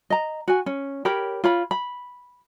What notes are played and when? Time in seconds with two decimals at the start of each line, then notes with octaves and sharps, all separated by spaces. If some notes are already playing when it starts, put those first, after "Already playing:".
0.10 D#5 A#5
0.48 F#4 G#5
0.66 C#4
1.05 G4 A#4 C#5 B5
1.44 F4 C#5 B5
1.71 B5